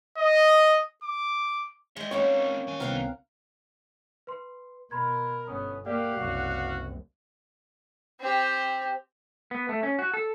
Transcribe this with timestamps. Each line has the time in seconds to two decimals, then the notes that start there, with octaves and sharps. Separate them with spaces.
0.18 D#5
1.04 D6
1.97 G#3 D#5 E5 G5 C#7
2.11 A#3 C4 C#4 D#4 F#4 C#5
2.67 D#3 G#5
2.80 C2 B3 C4 A#4 F5 F#5
4.27 B4 C6
4.91 B2 A#4 B5 C6 G#6
5.47 G1 B3 C#4 D#6
5.86 A#3 G4 D5 F5 F#5 D6
6.17 F#1 C2 F#4
8.20 C4 G4
9.51 B3
9.69 A3
9.83 C#4
9.99 F#4
10.14 A4